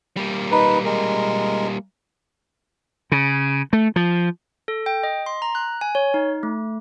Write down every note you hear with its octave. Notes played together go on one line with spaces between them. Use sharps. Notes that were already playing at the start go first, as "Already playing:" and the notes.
G3 A#3
D#4 B4
G#3 A#4
C#3
A3
F3
A4
G5
D#5
C6
A#5
F#6
G#5
C#5
D#4
A3